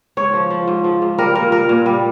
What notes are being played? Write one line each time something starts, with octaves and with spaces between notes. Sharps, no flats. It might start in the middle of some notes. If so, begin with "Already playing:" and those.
G#2 C#5
F3
F3
G#2
F3
G#2
G3 A#4
A#2 A#4
G3 A#4
A#2
G3